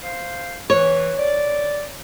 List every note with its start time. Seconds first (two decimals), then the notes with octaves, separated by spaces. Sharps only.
0.03 C5 F5
0.70 E3 C#5
1.18 D5